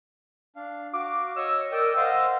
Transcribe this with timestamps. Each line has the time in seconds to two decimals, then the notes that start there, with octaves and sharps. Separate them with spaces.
0.56 D4 F5
0.93 F#4 F5 D6
1.36 C#5 D#5 E6
1.72 A#4 D5 D#5 G5
1.96 C5 D#5 F5 F#5